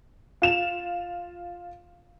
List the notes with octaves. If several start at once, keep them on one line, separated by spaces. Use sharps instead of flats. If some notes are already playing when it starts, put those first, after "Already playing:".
F4 E7 F7